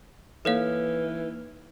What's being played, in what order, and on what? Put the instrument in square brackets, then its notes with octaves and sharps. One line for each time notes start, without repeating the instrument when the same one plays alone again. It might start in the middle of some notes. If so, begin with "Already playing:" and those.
[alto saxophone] E3 [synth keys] A#3 D#4 F6 [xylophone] A4 C#5 F5